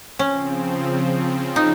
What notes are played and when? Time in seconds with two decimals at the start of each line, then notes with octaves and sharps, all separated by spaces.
0.19 C#3 F3 C4 C#4
1.56 D#4